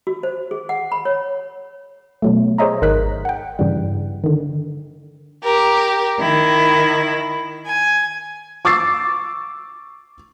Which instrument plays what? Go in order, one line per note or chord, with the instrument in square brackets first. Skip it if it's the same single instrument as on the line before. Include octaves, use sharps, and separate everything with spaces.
[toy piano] F#4
C5
G#4
F#5
B5
C#5
[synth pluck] B2 F#3 A3
G#4 C5 C#5 D#5 E5 A#5
G#1 D#4 A#4 D#5 F#6 B6
F#5 G5
G2 C#3 E3 G3
D3 D#3
[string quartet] G4 A#4
D#3 E4
G#5
[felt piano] C#6 D6 E6 A6 C7